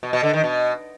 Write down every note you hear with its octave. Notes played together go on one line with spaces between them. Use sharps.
B2
B2
D3
D#3
B2